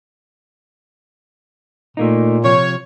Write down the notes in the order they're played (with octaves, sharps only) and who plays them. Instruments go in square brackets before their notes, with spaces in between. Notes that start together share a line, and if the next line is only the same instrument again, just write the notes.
[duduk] A#2 [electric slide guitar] A3 A#3 D#4
[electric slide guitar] C3 F3 [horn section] C#5